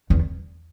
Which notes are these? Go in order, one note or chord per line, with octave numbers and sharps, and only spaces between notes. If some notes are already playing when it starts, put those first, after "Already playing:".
E2